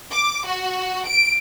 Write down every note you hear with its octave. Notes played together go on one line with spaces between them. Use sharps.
D6
F#4
D7